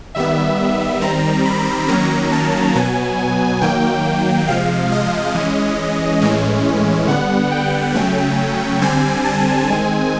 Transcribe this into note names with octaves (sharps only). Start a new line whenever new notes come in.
D#3 G3 B3 E5
D#3 G3 C4 A#5
B5
D#3 F#3 A#3 C#4 A#5
A5
B2 F#3 B3 G#5
G#5
D#3 F#3 A#3 G5
C3 F3 G#3 F5
D#5
E3 G#3 C#4
A2 E3 G#3 C#4
D3 G3 B3 F#5
G5
C#3 F#3 A3 C#4
D3 G3 C4 G#5
A5
D#3 G#3 C4 G#5